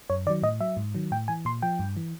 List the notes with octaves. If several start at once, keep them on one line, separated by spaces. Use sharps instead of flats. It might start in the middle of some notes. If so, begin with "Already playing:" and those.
F#2 C#5
D#3 F#3 D5
A2 D#5
F#3 E5
G#2
D#3 F#3
A2 G5
E3 G#5
A#2 C6
F3 G5
G2
E3